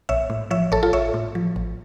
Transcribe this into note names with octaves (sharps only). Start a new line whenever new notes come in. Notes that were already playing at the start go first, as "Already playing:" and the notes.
A#1 C#5 E5
A2
F3 C#5 E5
A1 A4 C#5
F4 A4
A1 C#5 E5
A2
F3
A1